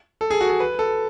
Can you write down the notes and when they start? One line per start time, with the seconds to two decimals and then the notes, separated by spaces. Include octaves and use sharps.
0.21 A4
0.30 G#4
0.41 F#4
0.50 G#4
0.60 B4
0.79 A4